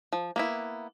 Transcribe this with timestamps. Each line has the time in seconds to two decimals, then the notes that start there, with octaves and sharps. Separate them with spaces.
0.13 F3
0.36 A#3 B3 E4